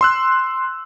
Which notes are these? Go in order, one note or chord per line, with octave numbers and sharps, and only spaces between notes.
C6 E6 F#6